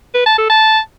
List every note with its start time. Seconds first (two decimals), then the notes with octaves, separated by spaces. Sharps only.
0.14 B4
0.26 A5
0.38 A4
0.50 A5